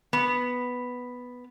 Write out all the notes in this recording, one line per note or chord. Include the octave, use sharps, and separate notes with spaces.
B3